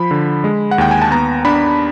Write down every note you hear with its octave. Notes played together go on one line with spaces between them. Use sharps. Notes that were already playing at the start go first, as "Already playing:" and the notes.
Already playing: F3 B5
D3
G#3
F#5
D#2 G5
G#5
A5
B3 A#5
D4 B5